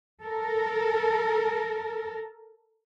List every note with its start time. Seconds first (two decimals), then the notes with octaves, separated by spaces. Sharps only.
0.22 A4 A#4